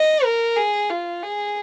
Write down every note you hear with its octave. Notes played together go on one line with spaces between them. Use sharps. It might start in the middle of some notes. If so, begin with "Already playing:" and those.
Already playing: D#5
A#4
G#4
F4
G#4